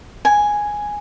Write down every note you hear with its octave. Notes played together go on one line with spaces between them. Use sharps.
G#5